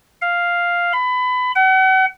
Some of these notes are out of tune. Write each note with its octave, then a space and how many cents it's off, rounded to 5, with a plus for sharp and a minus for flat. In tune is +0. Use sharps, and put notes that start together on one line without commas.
F5 +0
B5 +25
F#5 +40